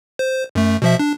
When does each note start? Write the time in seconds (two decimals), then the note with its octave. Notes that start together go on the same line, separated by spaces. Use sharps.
0.19 C5
0.55 F#2 A3
0.82 B2 F3 E5
0.99 D4